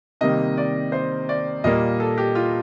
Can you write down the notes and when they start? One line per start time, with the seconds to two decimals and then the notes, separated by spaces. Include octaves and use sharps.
0.21 C3 D#3 G3 A#3 D#5
0.57 D5
0.92 C5
1.29 D5
1.64 A#2 G3 A#3 D#5
2.00 A4
2.18 G4
2.35 F4